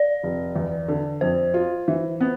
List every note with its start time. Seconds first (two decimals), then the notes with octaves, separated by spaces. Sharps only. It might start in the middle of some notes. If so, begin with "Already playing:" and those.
Already playing: D5
0.23 F1
0.56 E2
0.88 D3
1.21 F2 C5
1.54 F4
1.88 E3
2.21 B3